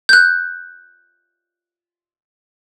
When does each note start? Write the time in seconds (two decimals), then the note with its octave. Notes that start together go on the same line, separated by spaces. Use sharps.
0.09 F#6 G6